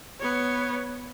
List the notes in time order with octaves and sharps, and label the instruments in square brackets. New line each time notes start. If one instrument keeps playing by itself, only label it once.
[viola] B3 C#5